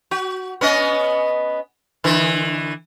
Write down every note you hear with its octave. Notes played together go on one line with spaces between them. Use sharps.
F#4
B3 C#4 D#5
D3 E3